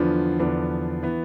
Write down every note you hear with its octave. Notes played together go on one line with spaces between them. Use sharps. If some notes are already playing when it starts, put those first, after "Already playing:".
Already playing: E2 D3 F3 B3 D4
E2 D3 F3 B3 D4
E3 B3